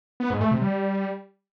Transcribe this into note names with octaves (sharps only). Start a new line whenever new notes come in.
B3
G#2
A3
C3
G3